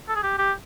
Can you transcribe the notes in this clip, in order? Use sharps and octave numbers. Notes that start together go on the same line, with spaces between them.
A4
G#4
G4
G4